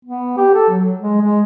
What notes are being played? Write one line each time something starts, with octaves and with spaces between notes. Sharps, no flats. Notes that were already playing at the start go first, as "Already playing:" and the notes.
B3
G4
A4
F#3
G#3
G#3